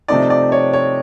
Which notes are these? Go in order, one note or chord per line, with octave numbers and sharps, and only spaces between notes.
C3 F3 A3 C4 D#4 D5
D5
C#5
C#5